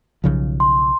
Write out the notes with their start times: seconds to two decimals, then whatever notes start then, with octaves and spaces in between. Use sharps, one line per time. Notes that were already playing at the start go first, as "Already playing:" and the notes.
0.24 B1 C#3 F3
0.60 C6